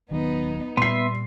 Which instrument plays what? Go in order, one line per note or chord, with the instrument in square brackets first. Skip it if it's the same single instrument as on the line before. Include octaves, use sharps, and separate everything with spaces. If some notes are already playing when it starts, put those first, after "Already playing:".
[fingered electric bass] D#1 D#3 F#3 [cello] B3 D#4
[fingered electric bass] A#2 [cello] G3 [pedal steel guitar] B3 E5 [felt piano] C6 C7